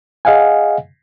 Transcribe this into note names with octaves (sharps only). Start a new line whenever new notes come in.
G#4 D#5 F5 F#5 G#5